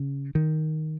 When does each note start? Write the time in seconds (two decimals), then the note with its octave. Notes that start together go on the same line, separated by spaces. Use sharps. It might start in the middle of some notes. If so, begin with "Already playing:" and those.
Already playing: C#3
0.35 D#3